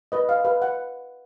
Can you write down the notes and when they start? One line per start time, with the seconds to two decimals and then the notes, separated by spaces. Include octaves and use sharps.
0.12 B4 D#5
0.29 F5
0.44 B4 F5
0.62 F#5